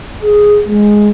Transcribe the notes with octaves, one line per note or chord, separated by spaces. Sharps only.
G#4
G#3